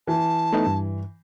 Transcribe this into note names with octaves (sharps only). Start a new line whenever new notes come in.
E3 A5
A3 B3 D#4
G2